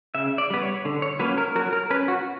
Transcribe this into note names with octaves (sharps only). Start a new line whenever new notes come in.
C#3 E5
D5
G3 B3 B4
C#5
D3
C#5
F#3 A#3 C#4 B4
A#4
F#3 A#4
A#4
C#4 B4
F#4